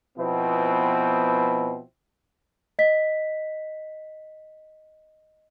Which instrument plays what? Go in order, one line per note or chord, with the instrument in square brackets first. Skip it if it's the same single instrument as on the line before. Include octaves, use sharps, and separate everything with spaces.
[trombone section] B2 F3 B3 C4 E4
[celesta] D#5 B6